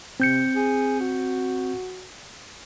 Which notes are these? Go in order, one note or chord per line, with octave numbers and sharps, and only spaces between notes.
C3 C4 G6 C#7
G#4
F#4